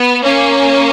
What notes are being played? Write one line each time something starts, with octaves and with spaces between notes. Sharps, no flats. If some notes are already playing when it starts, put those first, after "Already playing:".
Already playing: B3
A#3 C#4